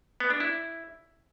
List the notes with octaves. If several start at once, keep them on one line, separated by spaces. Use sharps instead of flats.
B3
D4
E4